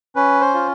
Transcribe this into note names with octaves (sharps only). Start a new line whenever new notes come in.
C#4 B4
C5
F4